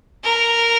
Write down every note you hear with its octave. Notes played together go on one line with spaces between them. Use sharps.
A#4